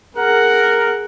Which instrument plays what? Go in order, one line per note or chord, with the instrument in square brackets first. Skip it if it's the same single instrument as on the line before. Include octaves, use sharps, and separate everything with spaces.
[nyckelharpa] G#4 F#5 [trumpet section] A#4